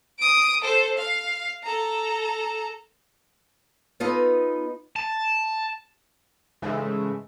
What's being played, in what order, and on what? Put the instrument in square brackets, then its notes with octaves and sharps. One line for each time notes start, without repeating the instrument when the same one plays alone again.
[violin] D#6 D7
A4 C5
F5
A4 A#5
[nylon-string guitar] B3 D#4 F4 A4 B4 D#5
[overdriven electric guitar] A5
[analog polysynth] G#2 C#3 E3 G#3 A3